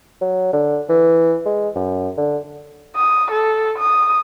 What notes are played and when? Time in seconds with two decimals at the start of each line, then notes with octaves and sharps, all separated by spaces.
0.21 F#3
0.53 D3
0.89 E3
1.46 G#3
1.76 F#2
2.18 D3
2.96 D#6
3.31 A4
3.79 D#6